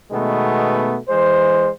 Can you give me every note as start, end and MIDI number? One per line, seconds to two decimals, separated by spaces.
0.11 0.97 47
0.11 0.97 51
0.11 0.97 56
0.11 0.97 57
0.11 0.97 59
1.08 1.69 52
1.08 1.69 56
1.08 1.69 72